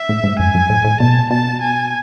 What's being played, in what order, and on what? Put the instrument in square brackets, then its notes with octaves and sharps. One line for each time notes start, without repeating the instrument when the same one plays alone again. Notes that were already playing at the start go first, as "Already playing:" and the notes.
Already playing: [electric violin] E5
[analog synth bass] A2
G#2
[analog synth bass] F#2 [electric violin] G#5
[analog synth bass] F#2
A2
A2
[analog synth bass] B2 [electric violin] A5
[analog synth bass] B2 [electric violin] A5
[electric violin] G#5